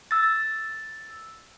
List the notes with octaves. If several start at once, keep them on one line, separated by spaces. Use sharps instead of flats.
E6 A6